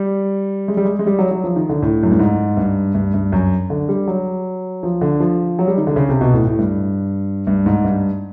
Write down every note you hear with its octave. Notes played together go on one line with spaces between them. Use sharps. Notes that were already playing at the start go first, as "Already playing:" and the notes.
Already playing: G3
G#3
G3
G#3
G#3
G3
F#3
F#3
F3
D#3
D3
A2
F#2
G2
G#2
G2
G2
G2
F#2
D3
G3
F#3
F3
D3
F3
F#3
G3
D#3
D3
C#3
C3
B2
A2
A2
G2
G2
G#2
G2